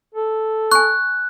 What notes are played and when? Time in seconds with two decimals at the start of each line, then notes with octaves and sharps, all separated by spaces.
0.14 A4
0.71 G#5 C#6 F#6